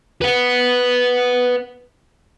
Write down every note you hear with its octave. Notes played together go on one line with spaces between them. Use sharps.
B4 F#5